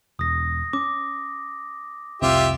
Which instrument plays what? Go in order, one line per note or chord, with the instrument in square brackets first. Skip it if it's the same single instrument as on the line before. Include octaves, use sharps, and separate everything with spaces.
[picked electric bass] E1 [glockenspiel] D#6 A#6
[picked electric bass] C#4 [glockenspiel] D6
[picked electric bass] F1 C2 C4 [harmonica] F4 G4 E5